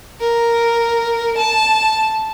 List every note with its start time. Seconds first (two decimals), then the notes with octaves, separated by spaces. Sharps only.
0.21 A#4
1.38 A5